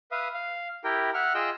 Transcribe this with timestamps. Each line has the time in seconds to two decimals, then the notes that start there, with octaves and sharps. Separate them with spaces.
0.11 B4 E5 F5 D#6
0.34 F5
0.84 E4 G4 A#4 G5
1.14 E5 F#5 F6
1.35 F4 G#4 D#5 G5 E6 G6